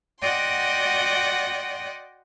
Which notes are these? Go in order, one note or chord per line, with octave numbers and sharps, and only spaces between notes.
F#4 D5 D#5 F#5 G5 C6